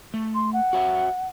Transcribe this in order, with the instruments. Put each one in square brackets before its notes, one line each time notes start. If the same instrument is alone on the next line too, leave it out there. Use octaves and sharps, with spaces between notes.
[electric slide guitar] A3
[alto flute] C6
F#5
[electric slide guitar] F#4 C#5 E5